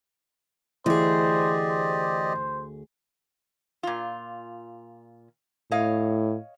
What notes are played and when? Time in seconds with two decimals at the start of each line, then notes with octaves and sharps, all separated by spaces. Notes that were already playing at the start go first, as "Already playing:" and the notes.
0.86 D2 E3 G4 G#4 C5 D5 D#5
1.70 C5
3.83 A#2 F4
5.71 A2 C#5 D#5 F5